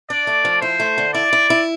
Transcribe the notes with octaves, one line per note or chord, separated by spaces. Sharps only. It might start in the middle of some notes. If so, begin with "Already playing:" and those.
D4 D5
A3
F3
E4 C5
A3
D3
E4 D5
E4
E4